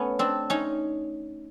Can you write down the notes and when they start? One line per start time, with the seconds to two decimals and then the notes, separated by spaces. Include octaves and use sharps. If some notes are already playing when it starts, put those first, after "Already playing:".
Already playing: A3 B3 C#4
0.19 C4 D4
0.50 C#4 D#4